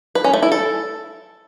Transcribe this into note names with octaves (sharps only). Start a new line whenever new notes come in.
B4
C#4
A3
E4
A4